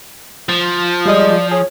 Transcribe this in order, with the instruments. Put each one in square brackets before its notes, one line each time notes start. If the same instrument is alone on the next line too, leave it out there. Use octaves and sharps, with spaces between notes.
[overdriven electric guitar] F3
[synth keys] G3 G#3 D#5 [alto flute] D5
[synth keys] G#4 [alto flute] C#5